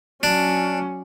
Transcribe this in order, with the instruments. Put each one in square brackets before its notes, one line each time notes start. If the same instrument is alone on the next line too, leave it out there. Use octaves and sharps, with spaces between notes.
[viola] F#3 C#4 [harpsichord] D4